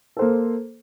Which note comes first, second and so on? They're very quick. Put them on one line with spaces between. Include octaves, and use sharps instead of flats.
A4 C5 A#3